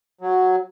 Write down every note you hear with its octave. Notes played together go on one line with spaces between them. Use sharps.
F#3